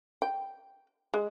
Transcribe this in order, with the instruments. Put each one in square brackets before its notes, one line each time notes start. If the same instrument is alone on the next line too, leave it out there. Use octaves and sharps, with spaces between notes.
[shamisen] G5
G#3